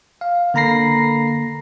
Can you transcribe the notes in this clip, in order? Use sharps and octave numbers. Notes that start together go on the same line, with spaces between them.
F5
D3 A#3 A#5 B5 A#6 C7